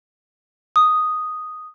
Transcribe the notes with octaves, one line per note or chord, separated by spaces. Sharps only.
D#6